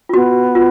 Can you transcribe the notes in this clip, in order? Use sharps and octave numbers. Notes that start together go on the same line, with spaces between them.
F4
B3 F#4
F4